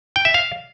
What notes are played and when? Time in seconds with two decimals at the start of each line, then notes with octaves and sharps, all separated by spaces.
0.16 G5
0.25 E5
0.34 F5